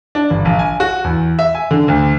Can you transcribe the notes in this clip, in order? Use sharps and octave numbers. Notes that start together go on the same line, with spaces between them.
D4
G1
A#1
G#5
F#4
E2
E5
G#5
D3
D2